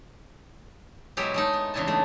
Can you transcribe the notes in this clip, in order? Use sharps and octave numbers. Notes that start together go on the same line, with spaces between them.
B2 F#3 G#3 E4 G4
G#3 A3 D#4
B3
E2 C#3 D4 E4 G#5 A5
G#3 A3